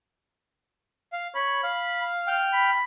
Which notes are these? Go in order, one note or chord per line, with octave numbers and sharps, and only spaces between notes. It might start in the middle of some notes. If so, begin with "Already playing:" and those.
F5
C#5 B5
F5
G5 F6
B5